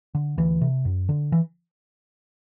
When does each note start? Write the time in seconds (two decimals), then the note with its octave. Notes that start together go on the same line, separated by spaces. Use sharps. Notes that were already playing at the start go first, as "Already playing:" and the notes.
0.15 D3
0.38 D2 E3
0.61 C3
0.85 F#2
1.09 D3
1.32 E3